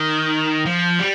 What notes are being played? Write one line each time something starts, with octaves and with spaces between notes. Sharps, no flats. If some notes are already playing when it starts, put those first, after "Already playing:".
Already playing: D#3
F3
G3